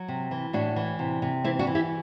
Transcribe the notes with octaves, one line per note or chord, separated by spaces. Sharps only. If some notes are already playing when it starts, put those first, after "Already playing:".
Already playing: F#3
C3
E3
A2 D4 F#4
E3
C3
C3
E3 C4 E4
D4 F#4
E3
E4 G4